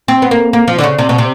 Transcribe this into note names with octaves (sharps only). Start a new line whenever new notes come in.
C4
B3
A#3
A#3
F3
D3
C#3
C3
B2
C3